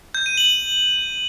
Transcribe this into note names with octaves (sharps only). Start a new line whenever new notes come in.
G6
D#7
F#7